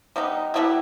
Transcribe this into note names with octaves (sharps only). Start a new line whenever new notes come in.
G3 B3 D#4
B2 G3 B3 E4